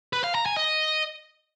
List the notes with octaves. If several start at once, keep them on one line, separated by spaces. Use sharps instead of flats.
B4
F5
A#5
G#5
D#5